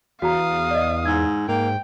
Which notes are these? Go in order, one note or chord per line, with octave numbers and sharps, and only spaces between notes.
E2 F#4 F5 A5 A#5 D#6
D5 D#5
G#2 G#5 E6 G#6
G#2 A#3 G5